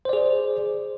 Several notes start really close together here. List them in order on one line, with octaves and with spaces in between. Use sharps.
C5 D5 G#4